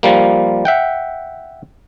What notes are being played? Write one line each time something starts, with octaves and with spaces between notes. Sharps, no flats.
F3 G3 A#3
E5 F#5 G5